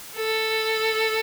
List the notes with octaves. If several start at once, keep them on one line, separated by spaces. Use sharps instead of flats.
A4